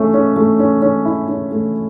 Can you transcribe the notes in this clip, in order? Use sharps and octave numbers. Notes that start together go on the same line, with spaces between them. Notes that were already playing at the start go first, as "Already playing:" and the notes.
Already playing: A3 C#4
C#4
A3
C#4
C#4
E4
C#4
A3